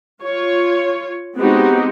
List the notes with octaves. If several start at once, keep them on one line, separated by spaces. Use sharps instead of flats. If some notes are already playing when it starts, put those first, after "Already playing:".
F4 C#5
G#3 B3 C4 D#4 F#4 G4